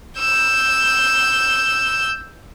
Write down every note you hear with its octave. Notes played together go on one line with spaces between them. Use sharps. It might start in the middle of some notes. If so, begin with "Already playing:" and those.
E6 G6